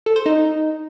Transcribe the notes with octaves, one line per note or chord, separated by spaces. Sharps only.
A4
C5
D#4